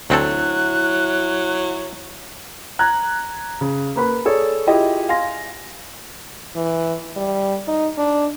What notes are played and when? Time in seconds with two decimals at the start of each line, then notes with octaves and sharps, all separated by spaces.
0.10 D2 F#3 C4 E4 A4 F#6
2.79 A#5 F#6 G#6
3.61 C#3
3.96 A#3 B4 B5
4.25 G#4 A4 C#5 D5
4.67 E4 F4 G4 G#4 D#5
5.09 F5 G#5 C6 A#6
6.56 E3
7.16 G3
7.68 D#4
7.97 D4